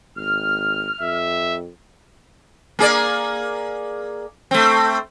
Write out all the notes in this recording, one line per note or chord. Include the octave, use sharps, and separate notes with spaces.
G#1 F6
F2 E5
A#3 G#4 D5
A3 C4